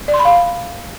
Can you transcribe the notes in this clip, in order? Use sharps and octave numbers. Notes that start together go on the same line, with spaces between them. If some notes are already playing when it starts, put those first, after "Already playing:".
D5
C6
B5
F5